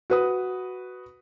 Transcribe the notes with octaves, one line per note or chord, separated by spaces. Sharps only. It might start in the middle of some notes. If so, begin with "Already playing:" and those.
F#4 B4 D#6